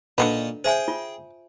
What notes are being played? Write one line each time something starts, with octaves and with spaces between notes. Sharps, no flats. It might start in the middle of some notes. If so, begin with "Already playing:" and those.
A#2 D3 A#3 D#4 B4
G#4 C5 E5 G5 G#5
F4